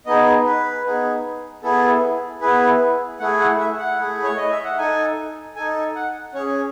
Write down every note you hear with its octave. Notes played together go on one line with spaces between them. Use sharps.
B3 D#4 G#4 D#5
B4
B3 D#4 G#4
B3 E4 G#4 A4
B3 E4 G#4 B4
A3 E4 G#4 F#5
F#5
E5
F#5
A3 E4 G#4
C#5
D#5
E5
F#5
D#4 A4 G#5
D#4 A4 G#5
F#5
C#4 G#4 C#5